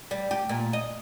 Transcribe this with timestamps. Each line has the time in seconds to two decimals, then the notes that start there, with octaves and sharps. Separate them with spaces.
0.11 G3
0.31 G4
0.49 A#2
0.73 D#5